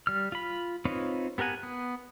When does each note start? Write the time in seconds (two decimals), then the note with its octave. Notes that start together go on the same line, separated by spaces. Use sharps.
0.07 G3 F6
0.32 F4 B5
0.85 C4 D#4 F4 B4 C#5
1.38 B3 G4 A#4 F#5 G#5
1.63 B3